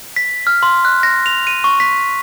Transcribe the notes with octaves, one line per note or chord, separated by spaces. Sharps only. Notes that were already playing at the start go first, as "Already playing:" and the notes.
B6
F6
C6
F#6
A#6
F7
D#7
C#6
B6